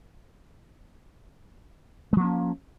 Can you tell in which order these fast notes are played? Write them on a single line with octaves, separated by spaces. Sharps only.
G#3 F3 A#3 C#4